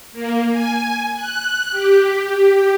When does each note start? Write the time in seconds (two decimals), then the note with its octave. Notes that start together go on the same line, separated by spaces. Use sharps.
0.12 A#3
0.51 G#5
1.15 F#6
1.70 G4